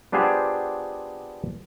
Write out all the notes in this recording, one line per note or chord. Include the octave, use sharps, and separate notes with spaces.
B3 D4 F4 G4 G#4 C5